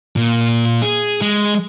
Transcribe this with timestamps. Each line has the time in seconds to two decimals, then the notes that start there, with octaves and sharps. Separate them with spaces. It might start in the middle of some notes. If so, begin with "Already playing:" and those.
0.16 A#2
0.82 G#4
1.21 G#3